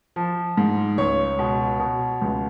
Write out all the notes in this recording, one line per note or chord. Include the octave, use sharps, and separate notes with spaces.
F3
G#2
C#2 C#5
B2
B2
C#2